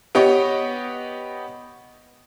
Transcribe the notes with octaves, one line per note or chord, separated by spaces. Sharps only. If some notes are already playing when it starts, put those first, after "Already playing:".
B3 G4 C#5 D#5